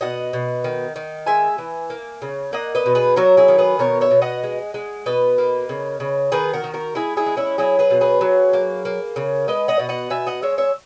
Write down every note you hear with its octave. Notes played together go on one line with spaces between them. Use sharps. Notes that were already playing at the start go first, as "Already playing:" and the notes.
B2 D#5 F#5
B2
D#3
D#3
G#3 E5 G#5
E3
A#3
C#3
A#3 D#5 F#5
B4 D#5
B2
G#4 B4
F#3 F#4 A#4
E4 G#4
D#3
G#4 B4
B2 A#4 C#5
C#5 E5
B2
D#5 F#5
G#3
G#3
B2 B4 D#5
A#3
C#3
C#3
D#3 G#4 B4
F#4 A#4
D#3
F#4 A#4
G#3 E4 G#4
E4 G#4
G#3
C#4 E4
F#3 E4 G#4
G#4 B4
B2
G#4 B4
F#3
A#3
A#3
C#3
G#3 B4 D#5
D#5 F#5
B2
D#5 F#5
B2 E5 G#5
D#5 F#5
G#3 C#5 E5
C#5 E5